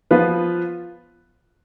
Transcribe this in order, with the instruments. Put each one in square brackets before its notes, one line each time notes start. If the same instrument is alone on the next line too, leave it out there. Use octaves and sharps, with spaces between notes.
[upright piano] F3 B3 F4 B4